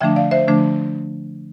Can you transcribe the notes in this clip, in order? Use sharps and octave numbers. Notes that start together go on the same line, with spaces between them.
D3 F3 A3 D4 E5 G5
D5 F5
C5 E5
D3 F3 A3 D4